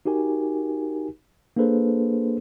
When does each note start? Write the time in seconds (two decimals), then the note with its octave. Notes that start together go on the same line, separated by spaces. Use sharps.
0.05 D#4 F#4 G4 A#4 G#5
1.56 A#3 D4 G#4 A4 B4 C5